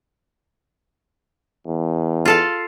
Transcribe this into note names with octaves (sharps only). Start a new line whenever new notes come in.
E2
F4 A4 F5